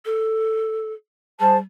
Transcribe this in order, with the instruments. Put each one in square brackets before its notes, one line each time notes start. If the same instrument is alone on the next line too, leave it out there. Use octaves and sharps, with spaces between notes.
[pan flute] A4
[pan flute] G3 [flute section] G#4 C5 A5